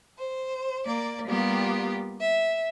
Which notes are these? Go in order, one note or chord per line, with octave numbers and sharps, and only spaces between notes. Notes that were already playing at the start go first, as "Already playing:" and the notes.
C5
A#3 D5
G3 A#3 B3 F4 G4
E5